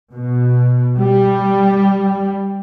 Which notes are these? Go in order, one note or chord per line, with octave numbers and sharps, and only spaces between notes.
B2
G3